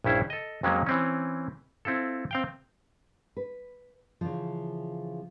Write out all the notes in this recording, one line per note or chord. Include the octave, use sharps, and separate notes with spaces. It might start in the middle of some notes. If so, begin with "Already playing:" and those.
A#1 G2 C#4 E4 C5
A4 D#5
F2 F3 F#3 G#3 A#3 C#4
E3 C4 C#4
C4 E4 F4 A4
C4 F5 G5
B4
C#3 E3 F3